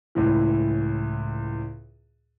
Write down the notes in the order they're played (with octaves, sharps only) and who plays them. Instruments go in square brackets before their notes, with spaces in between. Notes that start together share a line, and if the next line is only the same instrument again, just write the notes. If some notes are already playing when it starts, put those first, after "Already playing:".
[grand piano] C#2 A2 E3